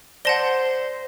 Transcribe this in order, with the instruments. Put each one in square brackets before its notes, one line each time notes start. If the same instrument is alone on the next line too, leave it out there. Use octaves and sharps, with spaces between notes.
[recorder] C5 [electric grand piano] D5 A#6 [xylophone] F#5 A5 G7